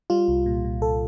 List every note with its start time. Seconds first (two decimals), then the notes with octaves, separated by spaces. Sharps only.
0.10 G3 F4
0.28 C2
0.46 A#2
0.65 A#2
0.82 C2 A4